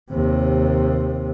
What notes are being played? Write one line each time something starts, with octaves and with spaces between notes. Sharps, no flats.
D#2 C3